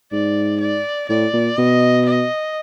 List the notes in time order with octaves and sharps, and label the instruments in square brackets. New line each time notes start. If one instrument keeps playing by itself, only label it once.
[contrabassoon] G#2 [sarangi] D5
[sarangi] D5
[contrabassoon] A2 [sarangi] D5
[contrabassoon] A#2
[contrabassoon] B2 [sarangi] D#5
[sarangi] D#5